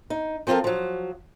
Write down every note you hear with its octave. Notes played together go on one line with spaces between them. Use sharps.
D#4
F3 C4 F4 A4 A#4
F3 F#3